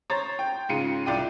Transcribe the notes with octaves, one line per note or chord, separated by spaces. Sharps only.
C5 C#5 A#5 A6
G5
G#2 C#3 F4 C#7 D#7
C2 F4 D5 G5 D#7